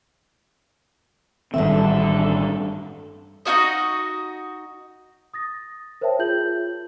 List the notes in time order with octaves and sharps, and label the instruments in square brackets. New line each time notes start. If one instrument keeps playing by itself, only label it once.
[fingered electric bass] A1 D#3 C4 [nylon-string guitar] G2 E5 [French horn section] D3 D4 A4
[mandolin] D#4 E4 F#4 D#5
[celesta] D#6 A6 A#6
A#4 C5 C#5 E5 G5 A5
F4 G#4 G6 F#7